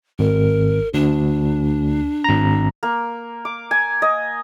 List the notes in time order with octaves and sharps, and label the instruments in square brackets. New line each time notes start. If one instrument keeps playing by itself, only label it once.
[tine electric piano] G#1 [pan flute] A#4
[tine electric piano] D2 [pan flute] D4
[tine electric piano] G#1 A#5
[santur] A#3
D6
G#5
D#5